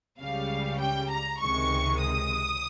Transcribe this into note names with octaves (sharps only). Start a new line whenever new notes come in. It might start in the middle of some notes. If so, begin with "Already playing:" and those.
C#2 C#3 G3 F5
G5
A#5
C#2 C3 D#3 G#3 C#6
D#6